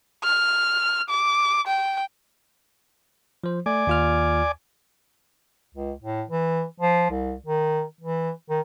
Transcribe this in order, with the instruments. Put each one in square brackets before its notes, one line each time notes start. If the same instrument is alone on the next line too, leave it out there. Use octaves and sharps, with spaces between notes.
[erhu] F6
D6
G5
[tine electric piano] F3 C5
[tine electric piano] A3 [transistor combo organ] D5 G#5 D6
[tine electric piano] D#2 F4 F6
[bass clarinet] C#2
A2
E3
F3
C2
D#3
E3
D#3